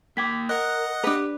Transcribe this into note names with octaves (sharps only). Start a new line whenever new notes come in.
A#3 G5 D6 G#6 B6
A#4 D#5 F#5 F#6
D4 G4 B4